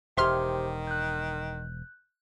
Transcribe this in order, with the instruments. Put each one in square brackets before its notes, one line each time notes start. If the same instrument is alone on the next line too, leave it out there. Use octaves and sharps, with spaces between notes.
[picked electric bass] E1 [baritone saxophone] D#3 [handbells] G4 C5 [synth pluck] E5 C6 F6
[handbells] F#6 G6